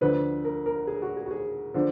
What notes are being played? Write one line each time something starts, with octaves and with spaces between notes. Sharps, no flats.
D2 D3 F3 B4
A#4
A#4
G#4
F#4
G#4
F#4
G#4
D3 F3